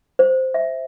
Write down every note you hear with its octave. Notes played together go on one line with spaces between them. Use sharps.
C5
E5